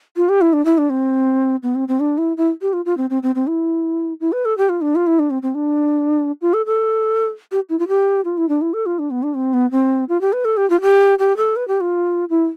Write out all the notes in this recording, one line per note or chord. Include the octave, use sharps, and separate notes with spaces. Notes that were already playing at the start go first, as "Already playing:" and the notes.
F4
G4
E4
D4
E4
D4
C4
B3
C4
C4
D4
E4
E4
G4
F4
F4
C4
C4
C4
C4
E4
E4
B4
A4
G4
F4
D4
F4
E4
D4
C4
C4
D4
F4
A4
A4
G4
E4
F4
G4
F4
E4
D4
E4
A4
F4
D4
B3
D4
C4
B3
C4
F4
G4
B4
A4
G4
F4
G4
G4
A4
B4
G4
F4
E4